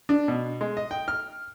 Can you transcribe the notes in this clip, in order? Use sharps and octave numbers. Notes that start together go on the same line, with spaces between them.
D4
B2
G#3
D#5
G5
F6